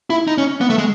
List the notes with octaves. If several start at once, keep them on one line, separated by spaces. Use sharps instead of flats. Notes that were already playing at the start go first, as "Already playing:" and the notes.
E4
D#4
C#4
B3
A3
G#3